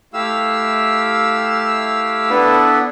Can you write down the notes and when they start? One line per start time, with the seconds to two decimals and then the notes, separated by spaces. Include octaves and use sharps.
0.13 A3 E4 G4 F5 E6
2.30 B3 D4 E4 A4 B4